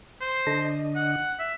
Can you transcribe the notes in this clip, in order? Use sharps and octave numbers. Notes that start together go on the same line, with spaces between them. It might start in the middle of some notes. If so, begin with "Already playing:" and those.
C5
D3 D4 D#5
F#5
E5